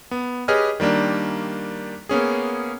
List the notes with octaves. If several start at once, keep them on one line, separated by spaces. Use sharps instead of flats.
B3
G4 G#4 B4 C#5 D#5 F6
D#3 G3 A#3 D4
A#3 B3 C#4 G#4